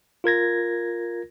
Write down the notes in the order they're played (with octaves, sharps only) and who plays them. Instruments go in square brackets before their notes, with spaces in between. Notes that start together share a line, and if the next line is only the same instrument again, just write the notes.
[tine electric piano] F4 A#4 G#6 A#6